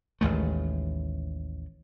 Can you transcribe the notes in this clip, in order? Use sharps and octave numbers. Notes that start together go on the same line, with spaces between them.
A1 D#2 G#3 A3